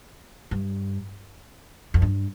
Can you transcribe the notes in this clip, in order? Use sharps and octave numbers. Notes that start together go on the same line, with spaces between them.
G2
F2
G2